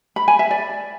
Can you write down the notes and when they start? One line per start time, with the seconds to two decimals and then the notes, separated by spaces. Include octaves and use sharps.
0.16 B5
0.28 G#5
0.39 E5
0.51 D5